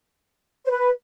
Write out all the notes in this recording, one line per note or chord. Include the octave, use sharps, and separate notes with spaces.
C5
B4